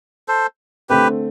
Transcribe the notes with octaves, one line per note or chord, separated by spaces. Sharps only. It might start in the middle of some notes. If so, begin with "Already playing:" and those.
A4 C5
D3 A3 C4 G4 B4